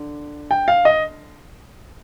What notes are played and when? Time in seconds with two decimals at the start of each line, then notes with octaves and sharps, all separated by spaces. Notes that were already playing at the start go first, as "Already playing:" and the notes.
Already playing: D3
0.51 G5
0.68 F5
0.85 D#5